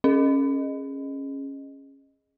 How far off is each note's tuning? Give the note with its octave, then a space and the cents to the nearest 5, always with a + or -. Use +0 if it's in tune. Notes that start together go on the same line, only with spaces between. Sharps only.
C#4 -15 G#4 +0 D#5 -10